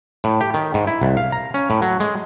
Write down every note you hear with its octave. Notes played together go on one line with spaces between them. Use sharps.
A2
G4
D#3
G#2
E4
C2
F5
A#5
C#4
A2
F#3
G#3